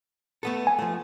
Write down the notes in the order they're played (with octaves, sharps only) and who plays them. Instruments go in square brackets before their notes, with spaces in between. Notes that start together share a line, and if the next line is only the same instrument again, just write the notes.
[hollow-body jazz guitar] A3 B3 A4
[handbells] G#5
[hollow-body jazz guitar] F3 A3